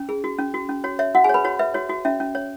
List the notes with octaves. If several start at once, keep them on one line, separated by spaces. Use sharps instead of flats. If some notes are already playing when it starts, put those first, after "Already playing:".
Already playing: C#4
G#4
F#4
C#4
F#4
C#4
F#4 C#5
C#5 E5
F#4 F#5
G#4 G#5
B4 C#5 B5
F#4 C#5
B4 E5
F#4 C#5
F#4
C#4 E5
C#4
C#5